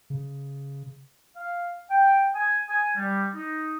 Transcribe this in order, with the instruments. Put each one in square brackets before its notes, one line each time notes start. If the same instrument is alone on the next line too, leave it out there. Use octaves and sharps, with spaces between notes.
[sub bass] C#3
[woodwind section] F5
G5
G#5
G#5
G3
D#4